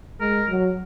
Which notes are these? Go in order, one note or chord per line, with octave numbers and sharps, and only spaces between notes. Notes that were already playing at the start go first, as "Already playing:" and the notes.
G#3 A#4
F#3